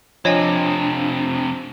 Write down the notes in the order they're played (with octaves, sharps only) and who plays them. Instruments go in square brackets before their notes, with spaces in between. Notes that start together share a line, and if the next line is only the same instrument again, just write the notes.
[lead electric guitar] F2 C3 [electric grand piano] F3 [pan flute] D4 [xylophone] C#5 D#5 G#5